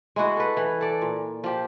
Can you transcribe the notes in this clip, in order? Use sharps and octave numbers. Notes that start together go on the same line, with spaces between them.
G#3 E4 F#4 D#5
A4 B4
E3
A4 D5
A#2
F3 G4